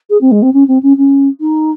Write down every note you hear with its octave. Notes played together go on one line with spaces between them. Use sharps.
G#4
C4
G#3
C4
C#4
C4
C#4
C#4
D#4